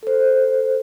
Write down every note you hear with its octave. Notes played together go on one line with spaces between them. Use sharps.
A4 C5